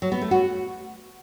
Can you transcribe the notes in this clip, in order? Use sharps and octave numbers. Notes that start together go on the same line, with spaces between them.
F#3
B3
A3
F#4